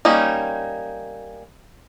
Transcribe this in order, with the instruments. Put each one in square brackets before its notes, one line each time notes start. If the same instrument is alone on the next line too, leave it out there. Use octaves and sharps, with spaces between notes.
[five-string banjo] G3 A#3 C#4 D#4